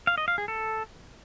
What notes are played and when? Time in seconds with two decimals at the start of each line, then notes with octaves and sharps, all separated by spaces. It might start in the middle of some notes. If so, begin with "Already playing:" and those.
0.07 F5
0.18 D#5
0.28 F5
0.38 G#4
0.48 A4